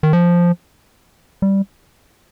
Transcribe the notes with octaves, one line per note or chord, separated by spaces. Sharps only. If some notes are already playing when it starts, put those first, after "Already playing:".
D#3
F3
G3